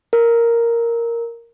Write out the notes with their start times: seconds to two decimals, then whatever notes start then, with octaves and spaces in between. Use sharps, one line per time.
0.13 A#4